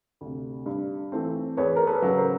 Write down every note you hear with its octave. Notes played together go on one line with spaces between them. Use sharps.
D2 C3
G2
E3 A3 C4
E2 B4 C#5
A#4
A4 B4
C#3 F#3
A#4 C5